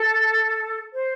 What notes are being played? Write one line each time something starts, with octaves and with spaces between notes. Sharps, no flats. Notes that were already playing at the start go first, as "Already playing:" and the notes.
Already playing: A4
C5